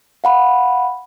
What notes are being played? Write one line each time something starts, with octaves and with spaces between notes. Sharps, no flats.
F5 F#5 B5